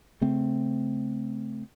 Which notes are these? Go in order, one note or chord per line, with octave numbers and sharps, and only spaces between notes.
C#3 A3 C4